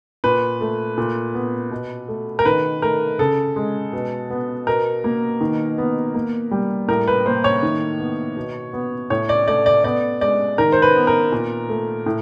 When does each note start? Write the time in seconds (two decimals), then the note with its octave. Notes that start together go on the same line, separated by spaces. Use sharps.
0.24 A#2 B4
0.61 A3
0.98 A#2
1.34 B3
1.71 B2
2.08 A3
2.39 A#4
2.45 D#3 B4
2.82 A3 A#4
3.19 C#3 A4
3.56 G#3
3.93 B2
4.30 B3
4.67 B2 A#4
5.04 A#3
5.41 D#3
5.78 B3
6.14 A#3
6.51 G3
6.88 A2 A#4
7.08 B4
7.26 A#3 C5
7.44 C#5
7.62 D#3
7.99 B3
8.37 B2
8.73 B3
9.10 A2 C#5
9.29 D5
9.48 A3 D5
9.66 D5
9.84 B3 D5
10.21 G#3 D5
10.58 D#3 A#4
10.72 C5
10.82 B4
10.96 B3
11.07 A#4
11.32 A#2
11.69 A3
12.06 A2